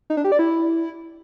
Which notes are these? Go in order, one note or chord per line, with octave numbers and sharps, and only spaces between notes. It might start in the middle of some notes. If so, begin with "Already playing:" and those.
D#4
D4
G4
D5
E4